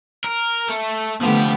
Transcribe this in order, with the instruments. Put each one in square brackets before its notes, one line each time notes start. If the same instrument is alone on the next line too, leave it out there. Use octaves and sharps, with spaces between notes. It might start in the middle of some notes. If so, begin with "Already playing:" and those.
[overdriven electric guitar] A#4
A3
[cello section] D3 A3 B3 [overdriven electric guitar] F3 G4